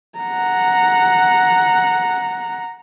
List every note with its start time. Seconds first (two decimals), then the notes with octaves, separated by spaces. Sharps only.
0.19 F#5 A#5